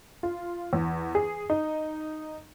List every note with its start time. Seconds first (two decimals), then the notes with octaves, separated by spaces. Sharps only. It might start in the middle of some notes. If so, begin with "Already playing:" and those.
0.23 F4
0.73 E2
1.15 G#4
1.50 D#4